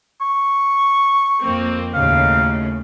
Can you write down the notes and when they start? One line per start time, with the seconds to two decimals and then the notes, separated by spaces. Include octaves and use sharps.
0.21 C#6
1.41 F2 A#3 C4
1.94 D#2 A2 C#3 F5